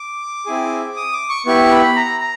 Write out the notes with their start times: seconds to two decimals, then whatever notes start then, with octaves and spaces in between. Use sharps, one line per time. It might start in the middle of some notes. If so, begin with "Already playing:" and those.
Already playing: D6
0.46 C4 E4 G#4
0.97 D#6
1.13 D6
1.30 C#6
1.46 B3 E4 G4 C#6
1.71 B5
1.96 A#5
2.21 A#5